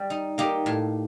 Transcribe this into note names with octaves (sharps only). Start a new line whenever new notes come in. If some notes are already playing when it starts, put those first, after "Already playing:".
Already playing: G3
D#4
A#3 D#4 G4
A2